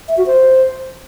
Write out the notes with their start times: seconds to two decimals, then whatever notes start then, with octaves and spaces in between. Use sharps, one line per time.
0.08 E5
0.17 F#4
0.26 C5